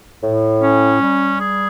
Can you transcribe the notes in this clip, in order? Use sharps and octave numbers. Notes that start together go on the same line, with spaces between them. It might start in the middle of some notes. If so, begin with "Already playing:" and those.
A2
C#4
G3
G#4